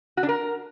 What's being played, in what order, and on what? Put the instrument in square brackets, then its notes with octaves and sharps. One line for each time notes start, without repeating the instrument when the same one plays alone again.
[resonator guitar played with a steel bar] F#4
D4
A#4